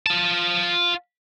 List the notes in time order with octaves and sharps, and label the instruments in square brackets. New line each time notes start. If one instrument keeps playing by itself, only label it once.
[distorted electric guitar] F4 A5